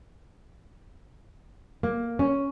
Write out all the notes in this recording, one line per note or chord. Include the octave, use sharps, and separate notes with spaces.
A#3
C#4